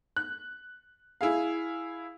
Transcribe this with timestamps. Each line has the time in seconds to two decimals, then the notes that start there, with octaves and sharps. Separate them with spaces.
0.16 F#6
1.21 E4 G#4 F5